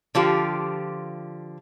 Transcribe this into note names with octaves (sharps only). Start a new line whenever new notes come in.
D3 F3 F4 G4